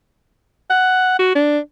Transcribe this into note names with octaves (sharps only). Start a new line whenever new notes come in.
F#5
F#4
D4